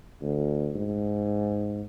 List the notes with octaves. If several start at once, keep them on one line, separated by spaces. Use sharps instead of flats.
D2
G#2